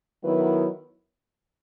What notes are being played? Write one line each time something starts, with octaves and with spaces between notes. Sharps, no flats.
D#3 F#3 B3 E4 B4